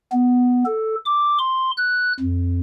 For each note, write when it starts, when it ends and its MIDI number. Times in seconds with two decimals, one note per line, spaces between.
0.12 0.64 59
0.66 0.95 69
1.06 1.38 86
1.39 1.71 84
1.77 2.13 90
2.20 2.60 41